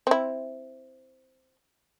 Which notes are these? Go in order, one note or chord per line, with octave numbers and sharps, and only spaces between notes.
C4 E4